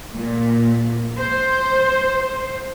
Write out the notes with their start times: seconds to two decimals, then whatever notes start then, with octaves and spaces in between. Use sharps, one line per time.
0.16 A#2
1.19 C5